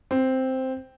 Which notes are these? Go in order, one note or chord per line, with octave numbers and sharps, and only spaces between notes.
C4